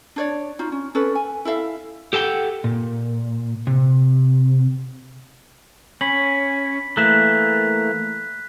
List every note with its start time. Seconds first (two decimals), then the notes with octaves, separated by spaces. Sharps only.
0.16 D4 C#5 D5
0.59 D#4 F4 F#4
0.72 C#4
0.95 C#4 A4 B4
1.15 G#5
1.45 E4 A4 E5 F5
2.13 G4 A4 F#5 G5
2.64 A#2
3.67 C3
6.01 C#4 B5 B6 F#7
6.97 E3 A3 A#3 F#6 B6 E7